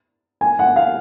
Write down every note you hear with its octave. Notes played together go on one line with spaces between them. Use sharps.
G#5
F#5
F5